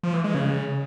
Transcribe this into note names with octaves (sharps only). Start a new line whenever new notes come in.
F3
E3
G#3
C#3